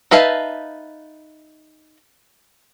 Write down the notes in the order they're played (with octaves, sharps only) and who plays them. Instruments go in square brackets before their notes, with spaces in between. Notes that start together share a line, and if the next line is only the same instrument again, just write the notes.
[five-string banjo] D#4 B4 E5 F5 A5